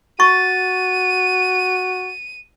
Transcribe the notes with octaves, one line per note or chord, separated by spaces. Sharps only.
F#4 C#6 A6 D#7